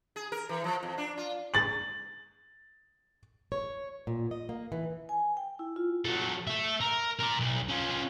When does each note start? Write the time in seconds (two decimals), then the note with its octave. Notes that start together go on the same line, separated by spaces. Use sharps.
0.16 G#4
0.32 A#4
0.49 E3
0.64 F3
0.83 F2
0.98 D4
1.18 F4
1.54 A6 F#7
3.52 C#5
4.07 A#2
4.31 D#5
4.49 A#3
4.72 E3
5.09 G#5
5.37 G5
5.59 E4
5.76 F4
6.05 F#3 A4
6.47 A4 E5
6.81 A#4
7.19 A#4 D5
7.40 B1
7.68 C#4 F4